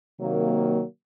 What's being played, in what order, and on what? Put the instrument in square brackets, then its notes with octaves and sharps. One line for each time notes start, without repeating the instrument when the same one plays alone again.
[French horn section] C3 D#3 F#3 A#3